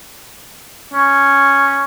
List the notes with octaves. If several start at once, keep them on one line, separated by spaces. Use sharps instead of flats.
C#4